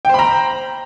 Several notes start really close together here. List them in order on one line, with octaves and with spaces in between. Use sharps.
G5 C5 B5 A#5